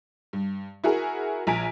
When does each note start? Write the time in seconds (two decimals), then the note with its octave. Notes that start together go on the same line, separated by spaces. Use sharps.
0.33 G2
0.84 E4 F#4 G#4 A#4
1.47 A#1 G#5 A#5 B6 D7